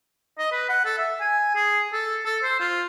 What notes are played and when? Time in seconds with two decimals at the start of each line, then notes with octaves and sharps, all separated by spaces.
0.38 D#5
0.52 B4
0.69 F#5
0.85 A4
0.98 E5
1.21 G#5
1.55 G#4
1.93 A4
2.25 A4
2.43 C5
2.60 F4